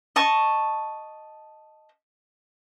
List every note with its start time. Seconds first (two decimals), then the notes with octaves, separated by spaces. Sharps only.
0.16 D#5 A5 C#6